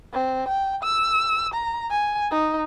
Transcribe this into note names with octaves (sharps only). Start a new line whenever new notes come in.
C4
G5
E6
A#5
G#5
D#4